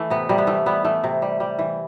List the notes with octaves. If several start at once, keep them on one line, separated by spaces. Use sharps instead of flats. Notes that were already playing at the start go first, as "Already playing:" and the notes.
Already playing: E3 A3
C3 B3
C3 G3
B3
E3 A3
G3 B3
E3 A3
C3
G3
G3
E3